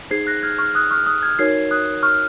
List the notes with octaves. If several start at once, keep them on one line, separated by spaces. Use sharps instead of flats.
D#4 G#4 C5 G#6 C7
F#6 A#6
F6 G#6
C#6 F6
D#6 F#6
C#6 F6
D#6 F#6
F6 G#6
D#4 F#4 A#4 C#5 G#6 C7
D#6 F#6
C#6 F6